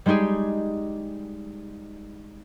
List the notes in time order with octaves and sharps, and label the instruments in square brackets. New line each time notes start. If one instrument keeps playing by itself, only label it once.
[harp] G3 G#3 D#4 G4 G#4